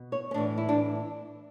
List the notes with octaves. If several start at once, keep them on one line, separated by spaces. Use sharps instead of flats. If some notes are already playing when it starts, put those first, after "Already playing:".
Already playing: B2
C#5
C#4
A2 E3 D4
E4
D4